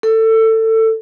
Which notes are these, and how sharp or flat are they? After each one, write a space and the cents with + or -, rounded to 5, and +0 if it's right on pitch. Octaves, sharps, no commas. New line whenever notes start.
A4 +20